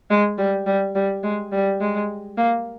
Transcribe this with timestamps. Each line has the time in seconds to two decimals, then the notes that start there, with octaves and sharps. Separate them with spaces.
0.10 G#3
0.38 G3
0.66 G3
0.95 G3
1.23 G#3
1.52 G3
1.81 G#3
2.37 A#3